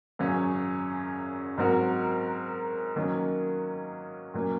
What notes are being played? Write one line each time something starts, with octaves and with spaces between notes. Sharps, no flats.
G#1 F#2 C#3 F#3 C#4
G#2 F#3 C4 F#4 A#4
D#3 F#3 A#3 C#4
A#2 F#3 A#3 C#4